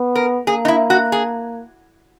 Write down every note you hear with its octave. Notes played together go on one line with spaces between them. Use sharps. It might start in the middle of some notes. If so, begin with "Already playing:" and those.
Already playing: B3
A#4
A#3 G#4
D#4
E4
F#4
G#4